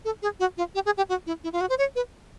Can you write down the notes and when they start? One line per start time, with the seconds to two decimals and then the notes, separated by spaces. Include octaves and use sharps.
0.05 A4
0.22 G#4
0.40 F#4
0.57 F4
0.75 G4
0.86 G#4
0.97 G4
1.09 F#4
1.26 E4
1.44 E4
1.53 F4
1.61 F#4
1.69 C5
1.78 C#5
1.96 B4